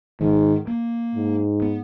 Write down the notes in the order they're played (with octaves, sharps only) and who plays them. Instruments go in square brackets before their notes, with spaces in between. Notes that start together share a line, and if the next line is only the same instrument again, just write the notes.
[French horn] G#2 [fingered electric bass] D#3
[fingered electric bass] A#3
[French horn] G#2
[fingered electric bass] B3